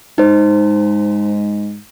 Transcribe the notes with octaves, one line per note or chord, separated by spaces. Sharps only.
G#2 D#4 C5